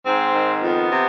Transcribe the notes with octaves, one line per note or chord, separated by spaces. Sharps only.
G#2 C4
D#3
F2 B3
C3